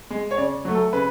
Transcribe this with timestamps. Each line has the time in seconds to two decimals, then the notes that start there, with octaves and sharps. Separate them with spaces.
0.10 G#3
0.31 C#5
0.38 C#3 D5
0.65 F#3 A3
0.75 A4
0.93 C#3 B4